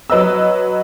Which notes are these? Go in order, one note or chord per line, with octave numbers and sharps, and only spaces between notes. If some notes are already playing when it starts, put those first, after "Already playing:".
F#3 B4 D#5 E6